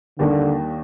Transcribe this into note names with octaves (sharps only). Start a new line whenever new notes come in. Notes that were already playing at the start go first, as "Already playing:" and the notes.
D#2 D3 D#3 G3 A#3 D4